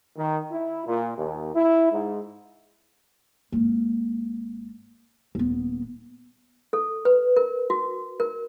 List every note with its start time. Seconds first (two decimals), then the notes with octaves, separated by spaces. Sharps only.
0.17 D#3
0.52 E4
0.87 A#2
1.18 D#2
1.55 E4
1.92 G#2
3.52 G#1 A#3
5.35 D#1 B3
6.73 A4
7.05 B4
7.36 A#4
7.70 F#4
8.20 A#4